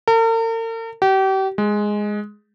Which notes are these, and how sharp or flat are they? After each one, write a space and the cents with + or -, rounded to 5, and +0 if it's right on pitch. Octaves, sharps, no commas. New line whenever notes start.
A#4 -45
G4 -35
G#3 +0